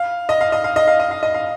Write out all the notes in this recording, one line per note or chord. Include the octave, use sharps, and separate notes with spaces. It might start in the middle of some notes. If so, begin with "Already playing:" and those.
Already playing: F5
D#5
F5
D#5
F5
D#5
F5
D#5
F5
D#5
F5